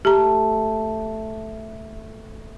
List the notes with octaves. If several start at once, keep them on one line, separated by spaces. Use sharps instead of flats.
A3 G4 A#5